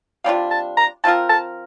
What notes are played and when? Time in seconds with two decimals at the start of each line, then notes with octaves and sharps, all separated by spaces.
0.24 C3 G3 D4 F4 F5
0.51 A5
0.77 A#5
1.04 F3 C4 F4 A#4 A5
1.29 A5